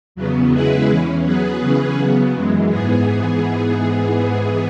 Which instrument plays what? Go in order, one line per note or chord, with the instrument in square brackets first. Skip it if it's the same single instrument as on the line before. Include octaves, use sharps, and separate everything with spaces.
[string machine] E2 C#3 F#3 B3
C#3 G#3 E4 G#4 B4
E2 E3 C#4
F#3 B3 G#4 B4
C#3 E3 C#4 G#4 B4
C#3 F#3 B3
F#2 E3 G#3
G#2 E3 B3 G#4